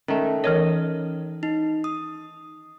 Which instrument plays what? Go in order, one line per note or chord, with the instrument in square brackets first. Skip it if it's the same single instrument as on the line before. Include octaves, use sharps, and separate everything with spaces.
[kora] D#3 A3 [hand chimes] C#4
[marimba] E3 A#4 C#5 [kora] D#5
[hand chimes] D#4
D#6